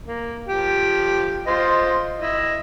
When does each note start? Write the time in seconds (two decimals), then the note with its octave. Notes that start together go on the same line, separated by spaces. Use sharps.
0.06 A#3
0.48 F3 G4
1.47 F4 C5 D#5
2.20 E4 D#5